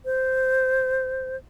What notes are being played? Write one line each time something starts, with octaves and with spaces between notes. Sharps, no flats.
C5